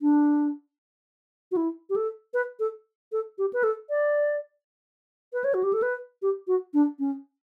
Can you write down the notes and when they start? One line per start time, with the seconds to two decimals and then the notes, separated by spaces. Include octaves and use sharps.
0.02 D4
1.52 F#4
1.57 E4
1.90 G4
1.96 A4
2.34 B4
2.60 A4
3.12 A4
3.38 G4
3.53 B4
3.64 A4
3.90 D5
5.33 B4
5.44 C#5
5.54 F#4
5.63 G4
5.73 A4
5.82 B4
6.22 G4
6.48 F#4
6.74 D4
6.99 C#4